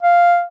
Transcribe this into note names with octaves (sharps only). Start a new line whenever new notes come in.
F5